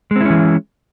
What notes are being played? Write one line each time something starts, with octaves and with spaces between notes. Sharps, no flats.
E3 G#3 C4 C#4 E4